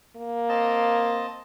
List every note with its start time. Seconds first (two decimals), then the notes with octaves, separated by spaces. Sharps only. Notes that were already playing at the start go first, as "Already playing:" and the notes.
0.16 A#3
0.49 C4 D#5 A5